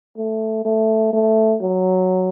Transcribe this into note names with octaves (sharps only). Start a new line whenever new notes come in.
A3
A3
A3
F#3